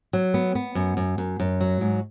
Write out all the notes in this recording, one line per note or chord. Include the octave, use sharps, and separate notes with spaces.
F#3
B3
B3
F#2
F#2
F#2
F#2
F#3
G#2